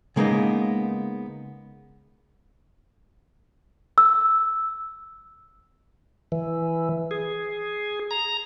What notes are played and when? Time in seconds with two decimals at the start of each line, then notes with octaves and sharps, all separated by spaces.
0.16 C#3 G#3 A#3 B3 D#4
3.98 E6
6.32 E3
7.11 G#4
8.11 A#5